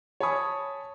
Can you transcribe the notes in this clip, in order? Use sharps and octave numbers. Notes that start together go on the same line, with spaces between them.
C#5 G#5 A5 B5 C#6 D#6